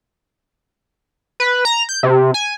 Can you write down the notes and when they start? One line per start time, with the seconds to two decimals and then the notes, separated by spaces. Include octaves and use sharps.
1.40 B4
1.65 A#5
1.89 G6
2.03 C3
2.34 G#5